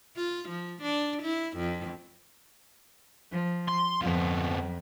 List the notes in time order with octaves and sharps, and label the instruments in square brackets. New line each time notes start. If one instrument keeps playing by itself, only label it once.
[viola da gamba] F4
F3
D4
E4
F2
[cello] F3
[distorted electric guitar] C6
[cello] F2 [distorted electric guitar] F3 B3